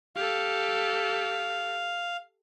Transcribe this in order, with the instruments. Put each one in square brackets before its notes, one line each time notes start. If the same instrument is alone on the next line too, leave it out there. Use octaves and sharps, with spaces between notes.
[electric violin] G4 A4 [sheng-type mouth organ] F5